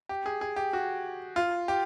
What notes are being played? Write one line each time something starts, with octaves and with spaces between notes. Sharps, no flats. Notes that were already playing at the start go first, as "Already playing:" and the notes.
G4
G#4
G#4
G4
F#4
F4
G4